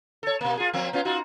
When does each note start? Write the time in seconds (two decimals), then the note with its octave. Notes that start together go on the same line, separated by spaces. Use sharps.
0.23 A4 C#5
0.41 B2 A#3
0.57 F4 G#4
0.73 F3 A#3 C4
0.93 B3 C#4 F4
1.05 D#4 F4 F#4